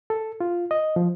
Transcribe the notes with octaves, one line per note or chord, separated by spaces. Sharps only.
A4
F4
D#5
F3